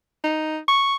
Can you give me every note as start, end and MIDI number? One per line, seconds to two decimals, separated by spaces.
0.24 0.59 63
0.68 0.96 85